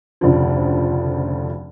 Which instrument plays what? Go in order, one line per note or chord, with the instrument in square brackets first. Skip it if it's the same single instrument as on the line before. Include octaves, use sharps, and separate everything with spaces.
[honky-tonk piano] F1 D2 C#3 F3